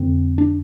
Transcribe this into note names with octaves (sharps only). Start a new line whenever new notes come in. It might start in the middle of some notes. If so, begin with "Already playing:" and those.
Already playing: F2 D3 C4
D4